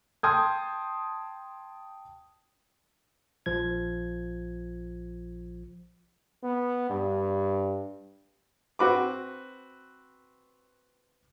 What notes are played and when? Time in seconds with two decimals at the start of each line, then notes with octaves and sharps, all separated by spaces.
0.23 G5 A5 C6 D#6 G6 G#6
3.46 A#1 F3 G#6
6.43 B3
6.90 G2
8.79 C4 F#4 B4 D6